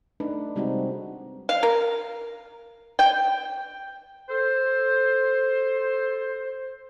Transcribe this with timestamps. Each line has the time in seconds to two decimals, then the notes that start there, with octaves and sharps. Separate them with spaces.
0.20 A3 D4 D#4 B4
0.56 C3 G3 G#3 C4 D#4 F#4
1.49 F5
1.63 A#4
2.99 G5
4.30 A4 C5